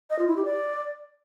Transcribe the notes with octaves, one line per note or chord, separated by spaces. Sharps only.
D#5
F4
E4
G4
D5